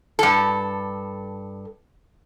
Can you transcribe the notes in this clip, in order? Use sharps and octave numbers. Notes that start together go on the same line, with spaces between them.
G2 A4